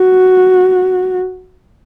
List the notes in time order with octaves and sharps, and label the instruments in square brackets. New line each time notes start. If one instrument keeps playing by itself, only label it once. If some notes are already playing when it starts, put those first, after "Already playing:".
Already playing: [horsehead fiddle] F#4